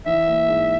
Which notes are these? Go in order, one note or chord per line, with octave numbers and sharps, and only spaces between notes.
E3 E5
A#3
G#2